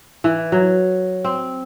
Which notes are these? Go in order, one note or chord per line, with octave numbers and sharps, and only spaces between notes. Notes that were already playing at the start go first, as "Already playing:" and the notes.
E3
F#3
C4